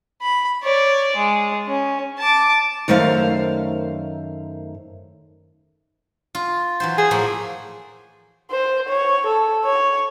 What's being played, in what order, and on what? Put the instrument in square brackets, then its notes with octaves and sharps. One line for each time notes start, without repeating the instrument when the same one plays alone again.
[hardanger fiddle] B5
C#5 D5
G#3
C#4
A5 D6
[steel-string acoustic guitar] F#2 D#3 A3 C5 F5
[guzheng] F4
E3 F#3 C5
[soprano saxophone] G#4 [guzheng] C5
[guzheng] A2 F3 A#3
[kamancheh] C5
C#5
A4
C#5